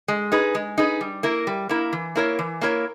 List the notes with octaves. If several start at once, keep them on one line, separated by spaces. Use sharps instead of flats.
G#3
D#4 G#4 B4
G#3
D#4 G#4 B4
G3
A#3 E4 A#4
G3
A#3 E4 A#4
E3
A#3 E4 A#4 C#5
E3
A#3 E4 A#4 C#5